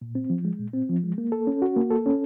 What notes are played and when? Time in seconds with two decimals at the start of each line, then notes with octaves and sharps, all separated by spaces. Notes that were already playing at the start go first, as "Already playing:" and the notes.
0.01 A#2
0.15 C4
0.30 F3
0.45 G#3
0.59 A#2
0.74 C4
0.89 F3
1.04 G#3
1.18 A#3
1.32 A4
1.47 C#4
1.62 F#4
1.76 A#3
1.90 A4
2.06 C#4